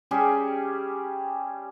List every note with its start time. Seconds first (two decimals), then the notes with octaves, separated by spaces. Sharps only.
0.11 G3 C#4 G4 G#4